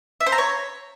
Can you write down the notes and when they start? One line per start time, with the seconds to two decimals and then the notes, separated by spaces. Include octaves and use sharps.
0.21 E5
0.26 C5
0.32 A#5
0.38 C#5